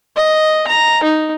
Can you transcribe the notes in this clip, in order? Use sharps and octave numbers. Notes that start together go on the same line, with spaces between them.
D#5
A#5
D#4